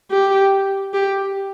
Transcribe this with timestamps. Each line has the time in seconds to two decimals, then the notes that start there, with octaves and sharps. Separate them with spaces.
0.11 G4
0.94 G4